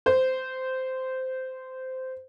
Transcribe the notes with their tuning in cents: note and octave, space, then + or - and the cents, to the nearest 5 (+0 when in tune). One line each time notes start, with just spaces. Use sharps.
C5 -15